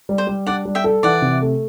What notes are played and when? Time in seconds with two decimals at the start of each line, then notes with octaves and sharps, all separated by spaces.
0.09 G3
0.18 C5
0.27 G3
0.46 D4 D5 F#5
0.65 G3
0.75 E5 G5
0.84 A4
1.03 E3 D5 F#5
1.22 C3
1.42 A3